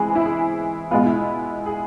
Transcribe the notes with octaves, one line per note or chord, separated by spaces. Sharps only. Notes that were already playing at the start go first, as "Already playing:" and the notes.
Already playing: E3 G#3 C4 G#4
E4
G#4
B2 G#3 B3 F4
E4
G#4